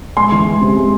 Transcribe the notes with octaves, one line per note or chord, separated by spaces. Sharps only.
G#3 G#5 C6
E3
G#3
C3
G#3